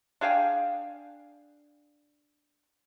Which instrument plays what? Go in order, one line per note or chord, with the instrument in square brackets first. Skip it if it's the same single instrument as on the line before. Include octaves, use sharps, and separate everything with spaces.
[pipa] D4 G#4 F5 G5